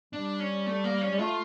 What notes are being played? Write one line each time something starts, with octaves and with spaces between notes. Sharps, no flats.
G3 D4
C#4
A3
A#3
C#4
G3
A3 F4